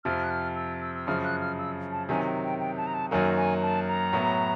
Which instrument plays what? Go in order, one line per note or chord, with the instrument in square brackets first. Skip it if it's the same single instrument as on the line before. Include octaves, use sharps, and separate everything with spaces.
[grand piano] F2 C3 F3 [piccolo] F6
[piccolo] F#6
F6
E6
E6
E6
[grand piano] F#2 C#3 F3 [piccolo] F6
[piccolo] F#6
F6
E6
A5
[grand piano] C3 D#3 F#3 [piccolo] G#5
[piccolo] G5
G5
G5
A5
A#5
A5
[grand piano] F#2 D#3 F#3 A#3 [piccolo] G#5
[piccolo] G#5
A5
A#5
[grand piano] A2 F#3 B3